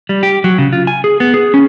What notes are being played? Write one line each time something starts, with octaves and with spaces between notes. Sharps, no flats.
G3
G4
F#3
C#3
F4
G#5
G#4
B3
G#4
C#4